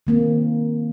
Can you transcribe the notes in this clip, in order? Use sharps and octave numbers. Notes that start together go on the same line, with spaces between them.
D#3 A#3 C4